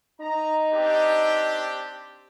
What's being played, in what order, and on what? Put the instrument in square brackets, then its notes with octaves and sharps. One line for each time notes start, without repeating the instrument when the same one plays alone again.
[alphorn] D#4 [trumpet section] A#5
[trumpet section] C4 D4 G4